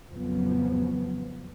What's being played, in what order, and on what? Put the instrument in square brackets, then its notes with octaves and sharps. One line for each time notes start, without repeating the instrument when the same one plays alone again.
[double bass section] A1 F2 C#3 F3 F#3 B3